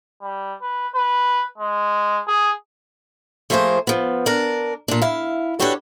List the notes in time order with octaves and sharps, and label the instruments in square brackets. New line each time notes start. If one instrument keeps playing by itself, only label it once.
[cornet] G3
B4
B4
G#3
G#4
[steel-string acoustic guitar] F3 A3 A#3 F4 G#4 C5
F3 B3
D4 A#4
A#2 D4
E4 F5
D4 F#4 G4 A4 B4 C#5